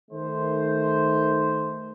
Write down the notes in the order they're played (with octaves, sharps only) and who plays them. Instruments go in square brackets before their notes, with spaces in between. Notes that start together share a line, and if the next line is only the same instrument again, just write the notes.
[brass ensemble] D#3 A3 C5